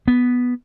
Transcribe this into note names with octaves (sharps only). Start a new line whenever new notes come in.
B3